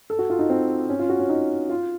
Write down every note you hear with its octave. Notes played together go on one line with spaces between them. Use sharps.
A4
F#4
F4
D#4
C4
C#4
F4
F#4
C#4
D#4
F4